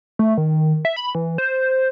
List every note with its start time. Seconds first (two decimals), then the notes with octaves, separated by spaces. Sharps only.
0.19 A3
0.37 D#3
0.85 E5
0.96 B5
1.15 E3
1.38 C5